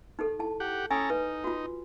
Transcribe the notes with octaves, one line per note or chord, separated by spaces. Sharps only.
D#4 G4 A4
E4 A5
G4 F#5
C#4 A4 G#5 A#5 D#6
D#4 B4
F4 F#4